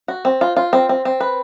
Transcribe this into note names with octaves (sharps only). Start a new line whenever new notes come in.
F#4
C4
F4
F4
C4
C4
C4
B4